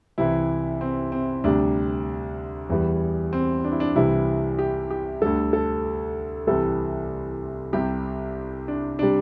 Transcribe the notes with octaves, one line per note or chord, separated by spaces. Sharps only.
C2 C3 E3 E4
C4
C4
D2 C3 G3 D4
E2 E3 G3
C4
D4
E4
D4
C2 C3 E3 G3 E4
G4
G4
D2 D3 G3 A4
A4
C2 C3 E3 G3 A4
C2 C3 G3 G4
D4
C3 G3 D4